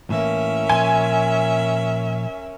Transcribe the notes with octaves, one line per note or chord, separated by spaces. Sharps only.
A2 E3 A#3 C#4 A#4 E5
A#2 F3 G#5 C6